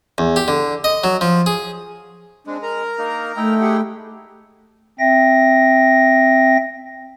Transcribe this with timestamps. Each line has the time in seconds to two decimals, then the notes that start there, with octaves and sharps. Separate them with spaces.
0.18 E2
0.36 G4
0.48 D3
0.84 D#5
1.04 F#3
1.21 F3
1.46 G#4
2.47 G#3 C4 D4
2.63 A#4 A#5
2.98 A#3 D#4
3.36 A3 D#4 E4 G5
3.61 G4 G#4 F#5
4.99 C4 E5 G5 A#6